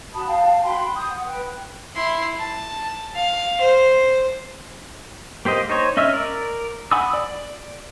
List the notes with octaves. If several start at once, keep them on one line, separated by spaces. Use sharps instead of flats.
F#4 A5 B5 D#6
F5 G5 A5
F#4 G5 B5 C6
D#6 G6
F#5
B4 G5
E4 C6
A5
F5
C5
A#3 G4 C5 D#5
D#4 C5 C#5
C#4 D#5 E5 E6 F6
A#4 D5
F#5 G#5 B5 D#6 E6
D5